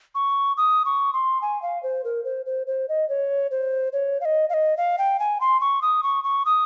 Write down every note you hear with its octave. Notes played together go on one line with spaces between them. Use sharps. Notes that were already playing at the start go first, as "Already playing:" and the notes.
C#6
D#6
C#6
C6
G#5
F5
C5
A#4
C5
C5
C5
D#5
C#5
C5
C#5
F5
D#5
F5
D#5
F5
G5
G#5
C6
C#6
D#6
C#6
C#6
D#6